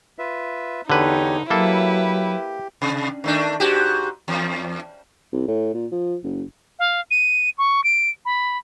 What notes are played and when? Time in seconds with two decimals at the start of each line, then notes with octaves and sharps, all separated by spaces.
0.19 F4 B4 E5
0.90 E2 D3 D#4 G4 B4 C#5
1.50 F#3 A#3 E4 G4 A4 B4
2.82 C3
3.24 D#3 A3 D4
3.60 G#2 F#4 G4
4.28 E2
5.33 C2
5.48 A2
5.74 A#2
5.92 F3
6.24 F#1
6.79 F5
7.11 D#7
7.58 C#6
7.84 D7
8.25 B5